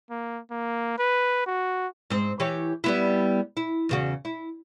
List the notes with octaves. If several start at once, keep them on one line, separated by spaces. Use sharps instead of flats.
A#3
A#3
B4
F#4
G#2 C4
E3 G4 C#5
G3 B3 E4
E4
E2 C#3 F#4
E4